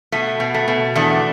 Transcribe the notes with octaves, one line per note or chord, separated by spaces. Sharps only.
B2 A3
B2
A3
B2
E2 A3 D4